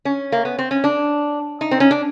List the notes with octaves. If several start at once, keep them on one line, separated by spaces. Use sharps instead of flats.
C#4
A#3
B3
C4
C#4
D4
D#4
C4
C#4
D4